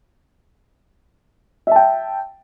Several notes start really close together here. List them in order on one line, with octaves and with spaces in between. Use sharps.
E5 A5 G5